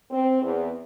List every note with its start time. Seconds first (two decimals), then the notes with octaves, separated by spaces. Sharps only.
0.10 C4
0.42 E2